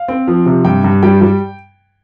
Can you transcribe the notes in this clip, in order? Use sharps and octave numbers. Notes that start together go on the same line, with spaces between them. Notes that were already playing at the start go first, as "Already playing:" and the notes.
Already playing: F5
C4
F3
C3
G2 G5
G2
G3 G5
G3